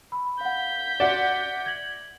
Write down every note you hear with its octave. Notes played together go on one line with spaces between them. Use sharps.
B5 E6
F5 F#5 G6 B6
F#4 D5 E5 F#5 E7
G#6 A#6 F#7